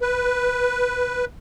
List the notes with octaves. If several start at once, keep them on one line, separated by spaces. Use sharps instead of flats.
B4